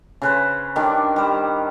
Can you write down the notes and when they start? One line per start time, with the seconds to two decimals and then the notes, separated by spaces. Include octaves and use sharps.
0.22 C#3 B4 C5
0.76 D#3 G3 D4 D5
1.16 G3 C5